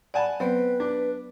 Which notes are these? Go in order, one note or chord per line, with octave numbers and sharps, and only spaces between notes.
D5 F#5 G#5 A5 B5
F#3 B3 C4 B4
D4